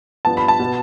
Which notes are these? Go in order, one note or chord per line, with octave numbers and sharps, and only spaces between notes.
G2 F3 B3 A5
B5
A5
B2 B3